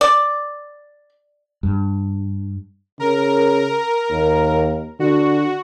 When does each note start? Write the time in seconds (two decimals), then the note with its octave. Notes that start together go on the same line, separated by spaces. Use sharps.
0.01 D5
1.63 G2
3.00 C#3 A#4
4.10 D#2
5.00 D3 F#4